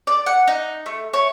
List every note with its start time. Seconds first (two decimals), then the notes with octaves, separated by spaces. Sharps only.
0.07 D5
0.26 F#5
0.48 D#4
0.86 A3
1.13 C#5